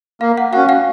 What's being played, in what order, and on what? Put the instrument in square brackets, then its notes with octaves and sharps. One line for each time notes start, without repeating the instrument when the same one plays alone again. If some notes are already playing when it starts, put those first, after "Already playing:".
[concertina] A#3 [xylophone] F5
[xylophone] F#5
[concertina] C#4 F#4 [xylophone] F5 G5
[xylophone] F5 G5